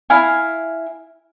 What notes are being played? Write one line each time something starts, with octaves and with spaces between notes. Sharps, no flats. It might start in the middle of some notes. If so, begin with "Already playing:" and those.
E4 F5 G#5